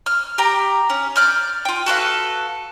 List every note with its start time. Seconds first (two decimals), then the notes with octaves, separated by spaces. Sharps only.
0.06 F6
0.38 G4 G5 A#5
0.90 C#4
1.16 D5 F6 G6
1.65 F4 G5
1.86 F#4 A4 B4 F5